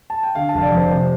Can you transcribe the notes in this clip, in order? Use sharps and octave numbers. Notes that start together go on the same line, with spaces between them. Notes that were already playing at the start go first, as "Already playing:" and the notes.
A5
G5
D3 F5
A5
F1 F5
D5
F2
C5
C3 C5